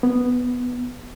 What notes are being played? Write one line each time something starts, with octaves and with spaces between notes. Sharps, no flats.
B3